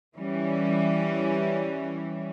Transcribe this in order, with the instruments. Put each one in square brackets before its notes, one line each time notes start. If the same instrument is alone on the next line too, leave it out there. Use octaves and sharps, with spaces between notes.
[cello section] E3 G3 C#4